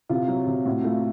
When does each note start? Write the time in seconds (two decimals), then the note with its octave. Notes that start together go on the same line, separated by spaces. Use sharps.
0.09 C3 F4
0.28 F#3
0.47 C3
0.65 A2 F#4
0.84 A3 F4